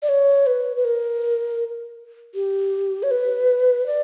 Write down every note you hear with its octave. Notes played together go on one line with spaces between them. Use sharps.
D5
C#5
B4
B4
A#4
G4
C#5
B4
D5